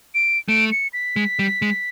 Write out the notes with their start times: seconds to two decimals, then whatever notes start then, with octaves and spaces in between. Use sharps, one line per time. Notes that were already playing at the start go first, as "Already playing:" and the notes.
0.15 D7
0.48 A3 D7
0.72 C#7
0.93 B6
1.16 G#3
1.39 G3
1.62 G#3